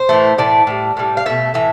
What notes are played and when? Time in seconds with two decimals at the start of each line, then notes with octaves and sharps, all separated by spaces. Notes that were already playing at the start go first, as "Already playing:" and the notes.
Already playing: C5
0.09 A2 E3 A3
0.38 A2 E3 A3 D5
0.67 A2 G3
0.97 A2 G3
1.17 F5
1.26 B2 A3 E5
1.54 A2 E3 E5